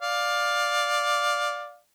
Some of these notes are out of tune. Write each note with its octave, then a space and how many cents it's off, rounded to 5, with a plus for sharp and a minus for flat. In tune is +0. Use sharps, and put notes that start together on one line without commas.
D5 +0 F5 +15